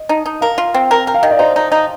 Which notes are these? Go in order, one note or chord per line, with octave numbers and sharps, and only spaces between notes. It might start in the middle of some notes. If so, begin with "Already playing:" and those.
Already playing: D#5
D#4
D#4
A#4 F5
F4
C4
A#4
A#4 G5
F5
D#3 D#5
D5
D#4 C5
D#4
D#4